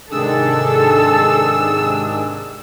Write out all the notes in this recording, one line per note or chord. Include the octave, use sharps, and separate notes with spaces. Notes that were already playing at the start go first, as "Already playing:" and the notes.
G#2 C3 D#3 D4 G#4 A4 E6